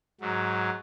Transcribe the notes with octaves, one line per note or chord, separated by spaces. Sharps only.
G#2 F#3